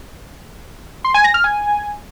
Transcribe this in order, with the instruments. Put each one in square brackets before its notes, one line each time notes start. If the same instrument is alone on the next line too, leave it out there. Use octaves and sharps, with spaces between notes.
[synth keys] C6
G#5
A#6
F6
G#5